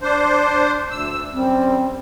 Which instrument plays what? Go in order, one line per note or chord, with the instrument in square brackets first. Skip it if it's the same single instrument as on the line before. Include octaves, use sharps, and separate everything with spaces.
[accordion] D4 C5
D2 E6
[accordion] F#2 G3 [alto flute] C4